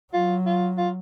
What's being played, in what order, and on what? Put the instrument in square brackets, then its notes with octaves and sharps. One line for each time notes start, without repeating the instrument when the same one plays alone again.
[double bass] F#3 [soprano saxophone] F4
[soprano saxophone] F4
F4